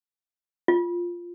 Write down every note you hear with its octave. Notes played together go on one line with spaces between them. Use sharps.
F4